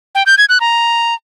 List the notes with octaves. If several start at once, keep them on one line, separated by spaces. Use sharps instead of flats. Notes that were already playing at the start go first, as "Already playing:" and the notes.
G5
G6
G#6
F#6
A#5